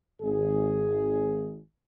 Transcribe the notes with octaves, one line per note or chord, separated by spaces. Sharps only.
G#1 G#4